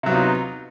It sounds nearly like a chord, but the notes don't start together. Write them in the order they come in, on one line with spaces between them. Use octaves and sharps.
C3 F#3 B3 F4 D#4